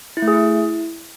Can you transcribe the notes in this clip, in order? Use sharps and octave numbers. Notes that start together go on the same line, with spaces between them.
E4
A3
G#4
E4